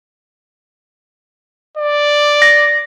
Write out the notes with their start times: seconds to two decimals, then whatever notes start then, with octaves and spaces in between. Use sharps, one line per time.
1.77 D5
2.42 A#6